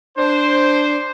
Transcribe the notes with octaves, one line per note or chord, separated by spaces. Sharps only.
D4 C5